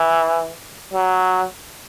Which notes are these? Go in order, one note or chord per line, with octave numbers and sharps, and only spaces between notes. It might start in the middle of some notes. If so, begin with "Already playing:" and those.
Already playing: E3
F#3